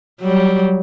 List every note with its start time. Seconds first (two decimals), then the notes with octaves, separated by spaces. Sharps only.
0.20 F#3 G3